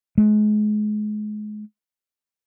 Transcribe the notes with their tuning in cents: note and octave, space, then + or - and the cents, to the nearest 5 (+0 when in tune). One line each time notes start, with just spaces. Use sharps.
G#3 +30